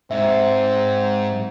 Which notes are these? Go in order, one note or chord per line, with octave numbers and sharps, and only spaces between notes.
G#2 C4 E5